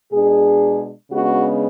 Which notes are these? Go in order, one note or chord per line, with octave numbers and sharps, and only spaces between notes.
B2 G#3 D4 G#4
C#3 G#3 B3 D4 F#4